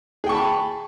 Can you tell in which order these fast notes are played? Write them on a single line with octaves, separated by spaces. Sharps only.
G#4 G5 C#6 A5 B5